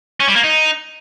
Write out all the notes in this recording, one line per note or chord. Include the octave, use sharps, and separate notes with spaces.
C#4
G3
A#3
D#4